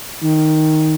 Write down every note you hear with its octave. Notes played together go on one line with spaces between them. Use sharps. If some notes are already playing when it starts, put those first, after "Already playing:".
D#3